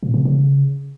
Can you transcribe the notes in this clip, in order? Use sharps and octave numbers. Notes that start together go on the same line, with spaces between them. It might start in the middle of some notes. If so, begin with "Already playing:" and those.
A#2
C3
C#3